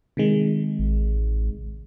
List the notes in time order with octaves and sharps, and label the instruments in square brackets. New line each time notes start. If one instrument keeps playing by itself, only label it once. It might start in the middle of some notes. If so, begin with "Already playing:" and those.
[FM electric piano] C3 D#3 G#3
[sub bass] A1